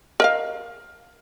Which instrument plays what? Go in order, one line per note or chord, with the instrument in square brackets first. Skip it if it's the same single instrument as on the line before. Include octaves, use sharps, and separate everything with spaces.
[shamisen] A#4 D#5 F5